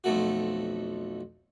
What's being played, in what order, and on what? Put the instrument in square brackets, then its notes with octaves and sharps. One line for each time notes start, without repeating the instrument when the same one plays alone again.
[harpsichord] B1 F2 A3 F#4